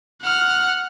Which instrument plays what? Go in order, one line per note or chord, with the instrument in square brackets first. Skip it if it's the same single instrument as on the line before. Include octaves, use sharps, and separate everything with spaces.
[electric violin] F#5 F6